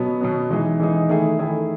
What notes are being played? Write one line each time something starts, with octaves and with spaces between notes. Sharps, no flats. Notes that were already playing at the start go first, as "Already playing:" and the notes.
Already playing: B2 F#3 B3
B2 F#3 B3
E3 G#3 D#4 G#4
E3 G#3 D#4 G#4
D#3 A3 E4 G#4
D#3 A3 E4 G#4